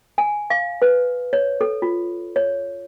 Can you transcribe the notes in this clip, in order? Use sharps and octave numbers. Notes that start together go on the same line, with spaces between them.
G#5
F5
B4
C#5
A4
F4
C#5